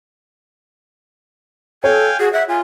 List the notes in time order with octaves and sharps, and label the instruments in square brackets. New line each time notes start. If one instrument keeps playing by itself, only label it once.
[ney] A4 [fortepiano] C#5 [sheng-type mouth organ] F5 G5 G#5
[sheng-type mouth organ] F#4 [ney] G#4
[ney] E5 [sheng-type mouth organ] F#5
[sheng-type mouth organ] F4 [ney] G#5